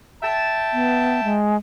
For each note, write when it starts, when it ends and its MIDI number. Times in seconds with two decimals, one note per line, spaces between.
0.22 1.34 76
0.22 1.34 79
0.22 1.34 81
0.73 1.21 59
1.24 1.57 56